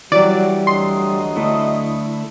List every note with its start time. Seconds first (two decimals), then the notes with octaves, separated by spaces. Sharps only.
0.12 E3 F#3 G3 D5
0.67 D2 F#3 D#5 C6
1.36 D3 A3 E4